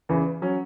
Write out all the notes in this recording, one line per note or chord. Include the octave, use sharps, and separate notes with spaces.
E2 C#3 E3
F#3 C#4